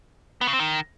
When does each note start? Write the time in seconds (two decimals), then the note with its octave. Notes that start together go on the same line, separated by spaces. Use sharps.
0.41 B3
0.47 C#3
0.53 C4
0.59 D#3